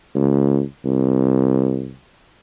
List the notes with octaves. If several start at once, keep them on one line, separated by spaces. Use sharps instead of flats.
C#2
C2